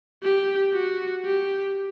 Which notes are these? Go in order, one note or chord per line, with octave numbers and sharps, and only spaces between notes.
G4
F#4
G4